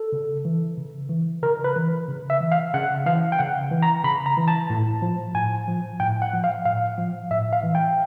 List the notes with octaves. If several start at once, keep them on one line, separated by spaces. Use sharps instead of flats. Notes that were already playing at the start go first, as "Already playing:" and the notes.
Already playing: A4
C#3
E3
C#3
E3
C#3 A#4
B4
E3
C#3
E5
E3
F5
C#3 F#5
E3 F5
G5
C#3 F#5
E3
A#5
C#3 B5
A#5
E3
A5
A2
F3
A2 G#5
F3
A2 G5
F#5
F3
F5
A2 F5
F3
A2 E5
F5
E3
G5